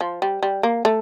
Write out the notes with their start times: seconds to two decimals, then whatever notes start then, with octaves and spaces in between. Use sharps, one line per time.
0.01 F3
0.22 G3
0.43 G3
0.63 A#3
0.85 A3